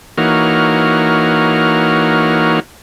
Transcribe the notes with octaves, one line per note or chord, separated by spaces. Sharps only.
E3 A#3 D#4 F#4 C#5 F6